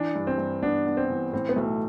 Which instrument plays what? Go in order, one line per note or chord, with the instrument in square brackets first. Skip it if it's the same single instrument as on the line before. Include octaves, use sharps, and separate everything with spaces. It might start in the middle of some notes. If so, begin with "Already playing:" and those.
Already playing: [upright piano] E3 [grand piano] D4
[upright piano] G2
[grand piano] C4
[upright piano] G2
[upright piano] B3 [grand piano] D4
[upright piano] B3
[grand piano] C4
[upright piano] E3
[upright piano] A2 [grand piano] C4
[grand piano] B3
[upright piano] B1 [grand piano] A3